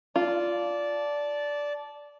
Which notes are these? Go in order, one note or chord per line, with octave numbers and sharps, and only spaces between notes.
F4 D5 A5